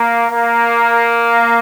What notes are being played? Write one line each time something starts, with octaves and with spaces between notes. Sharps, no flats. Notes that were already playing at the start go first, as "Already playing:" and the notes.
Already playing: A#3
A#3